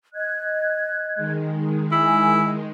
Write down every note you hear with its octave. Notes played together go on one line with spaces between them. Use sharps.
D#5 F#6 G#6
D#3 G#3
E4 G#5